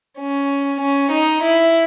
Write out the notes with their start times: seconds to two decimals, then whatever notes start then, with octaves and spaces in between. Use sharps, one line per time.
0.19 C#4
0.81 C#4
1.11 D#4
1.43 E4